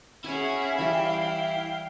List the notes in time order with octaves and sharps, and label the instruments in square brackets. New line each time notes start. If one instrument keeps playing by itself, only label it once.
[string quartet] C#4 F#4 G#4 [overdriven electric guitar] E4 E5 [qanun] C#5 G#5
[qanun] E3 G3 [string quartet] F5 G5